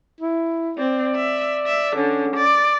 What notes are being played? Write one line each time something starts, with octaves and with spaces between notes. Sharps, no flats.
E4
C4 D5
E5
E5
D3 C#4
D5